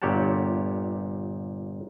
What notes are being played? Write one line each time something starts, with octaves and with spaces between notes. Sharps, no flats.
G1 A#2 G4 C#5 F#5 A5